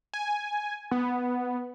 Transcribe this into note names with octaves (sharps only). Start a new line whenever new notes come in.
G#5
B3